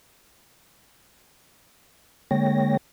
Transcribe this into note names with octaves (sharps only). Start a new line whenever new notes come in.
D3 G#3 A#3 C#5 G5 A#6